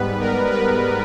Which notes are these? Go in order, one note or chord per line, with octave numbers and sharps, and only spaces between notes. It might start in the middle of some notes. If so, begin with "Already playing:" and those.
Already playing: G#2 G3 B3 B4
A#4
B4